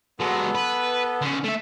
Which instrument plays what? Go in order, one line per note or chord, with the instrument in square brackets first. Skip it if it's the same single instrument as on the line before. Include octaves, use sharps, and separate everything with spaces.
[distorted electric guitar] F#3 G#3 [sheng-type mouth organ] B3 A4
[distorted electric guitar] B4
D3 C#4
A3 E5